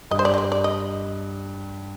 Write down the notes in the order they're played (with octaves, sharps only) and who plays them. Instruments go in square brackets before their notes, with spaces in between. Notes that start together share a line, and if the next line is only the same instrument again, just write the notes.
[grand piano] G2 G3 [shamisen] D#5
[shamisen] C5
D5
D#5
D5
D5
D#5